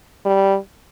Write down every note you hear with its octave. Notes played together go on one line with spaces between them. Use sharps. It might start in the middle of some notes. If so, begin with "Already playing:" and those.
G3